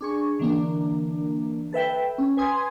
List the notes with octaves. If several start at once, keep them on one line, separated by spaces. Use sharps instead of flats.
D4 G#4 C#6
D3 E3 A#3 D4
A4 B4 E5 G5
C#4
B4 G#5 C6 D#6 G#6